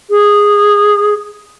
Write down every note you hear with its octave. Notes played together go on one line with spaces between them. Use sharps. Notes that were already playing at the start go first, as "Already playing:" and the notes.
G#4